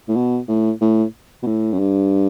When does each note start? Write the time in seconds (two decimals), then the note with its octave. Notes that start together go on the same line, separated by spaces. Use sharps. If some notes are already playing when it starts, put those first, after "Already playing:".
0.09 A2
0.16 B2
0.48 A2
0.81 A2
1.43 B2
1.47 A2
1.73 F#2
1.79 G2